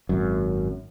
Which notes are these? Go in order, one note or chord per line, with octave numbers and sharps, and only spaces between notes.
G#1 F#2